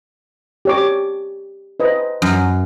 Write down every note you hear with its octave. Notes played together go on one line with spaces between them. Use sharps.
G4 C#5 D6
B4 C5 D#5
F#2 D#6